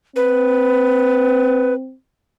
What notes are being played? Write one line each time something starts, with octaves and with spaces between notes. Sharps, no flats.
C4 B4